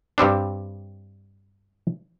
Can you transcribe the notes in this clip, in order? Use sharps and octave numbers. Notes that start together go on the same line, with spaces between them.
G2 G3 C4 D4